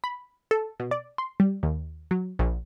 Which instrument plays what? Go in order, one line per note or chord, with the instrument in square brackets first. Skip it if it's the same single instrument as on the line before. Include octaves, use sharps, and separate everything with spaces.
[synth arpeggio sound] B5
A4
B2
D5
C6
G3
D#2
F#3
A#1